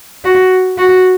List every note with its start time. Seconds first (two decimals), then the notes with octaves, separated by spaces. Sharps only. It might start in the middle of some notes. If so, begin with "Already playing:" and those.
0.25 F#4
0.78 F#4